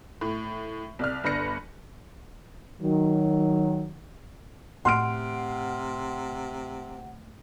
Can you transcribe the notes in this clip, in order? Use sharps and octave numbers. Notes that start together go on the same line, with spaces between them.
A2
C2 D5 F6
G1 D4 B4 A#6 C#7
D#3 F#3
A2 C3 F#5 C6 F6 D7